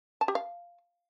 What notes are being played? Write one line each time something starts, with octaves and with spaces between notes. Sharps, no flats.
A5
G4
F5